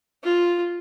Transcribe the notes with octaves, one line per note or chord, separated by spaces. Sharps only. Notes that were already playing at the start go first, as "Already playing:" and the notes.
F4